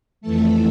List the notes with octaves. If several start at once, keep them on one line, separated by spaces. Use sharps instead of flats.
F2 E3 A3 A4